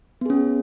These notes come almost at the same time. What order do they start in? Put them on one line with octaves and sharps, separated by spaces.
B3 G#4 C#4